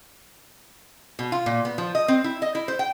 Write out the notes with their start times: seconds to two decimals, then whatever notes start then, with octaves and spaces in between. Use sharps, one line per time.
1.19 B2
1.32 F4
1.46 A#2
1.65 B3
1.78 F3
1.95 D#5
2.08 C4
2.24 E4
2.42 D#5
2.55 E4
2.68 C5
2.79 G5